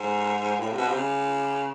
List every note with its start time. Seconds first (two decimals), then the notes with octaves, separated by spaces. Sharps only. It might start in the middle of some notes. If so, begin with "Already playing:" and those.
Already playing: G#2
0.60 A2
0.72 C3
0.78 B2
0.88 C3
0.96 C#3